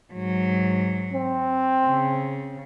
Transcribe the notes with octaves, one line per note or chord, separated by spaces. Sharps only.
G#2 F#3
C4
C#3